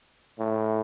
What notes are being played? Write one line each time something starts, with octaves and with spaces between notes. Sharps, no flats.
A2